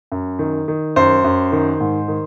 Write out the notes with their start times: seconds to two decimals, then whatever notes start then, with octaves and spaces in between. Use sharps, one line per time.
0.12 F#2
0.39 D#3
0.68 D#3
0.96 F#2 C5
1.24 F#2
1.52 D#3
1.80 G#2
2.08 D#3